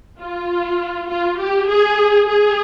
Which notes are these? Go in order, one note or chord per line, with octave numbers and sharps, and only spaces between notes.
F4
F4
G4
G#4
G#4